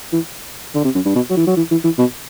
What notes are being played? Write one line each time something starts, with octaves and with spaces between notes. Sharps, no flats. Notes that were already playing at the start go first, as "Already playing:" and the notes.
E3
D3
C3
F#2
G2
B2
F#3
E3
F#3
E3
E3
E3
B2